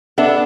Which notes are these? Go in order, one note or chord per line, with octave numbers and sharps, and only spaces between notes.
B3 D4 A4 E5